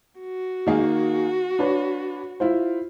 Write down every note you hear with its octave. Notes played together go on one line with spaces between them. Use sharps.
F#4
D#3 A#3 G#4
D4 B4 C#5
E4 F4 C5